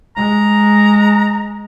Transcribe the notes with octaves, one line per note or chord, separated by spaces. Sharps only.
G#3 A#5